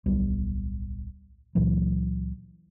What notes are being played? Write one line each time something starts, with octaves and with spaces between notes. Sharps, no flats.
D1 B1 G3 B3
C#2 A#2 E3 F#3